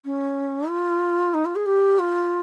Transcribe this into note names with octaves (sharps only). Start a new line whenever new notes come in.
C#4
F4
D#4
F4
G#4
G4
F4